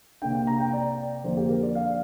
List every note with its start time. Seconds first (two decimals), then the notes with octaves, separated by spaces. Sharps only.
0.22 C3 A#3 D4 G5
0.35 G5
0.47 A#5
0.60 G5
0.73 D5
1.24 F2 D3 A#3 D4 C5
1.37 G4
1.49 A#4
1.62 D5
1.75 F5